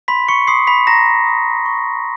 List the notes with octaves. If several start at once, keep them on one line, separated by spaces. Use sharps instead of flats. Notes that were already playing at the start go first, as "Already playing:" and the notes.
B5 C6 B6
C#6 C#7
C6 D#6 C7
B5 B6
A#5 B5 A#6
D#6
C#6